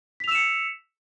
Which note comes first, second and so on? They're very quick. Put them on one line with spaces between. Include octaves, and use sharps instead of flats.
B6 F7 E6 E7 C#7